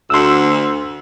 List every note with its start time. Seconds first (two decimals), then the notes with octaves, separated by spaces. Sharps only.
0.10 D2 C6 E6